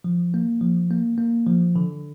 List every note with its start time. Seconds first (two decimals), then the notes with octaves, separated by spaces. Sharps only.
0.04 F3
0.34 A#3
0.61 F3
0.91 A#3
1.18 A#3
1.46 F3
1.76 D3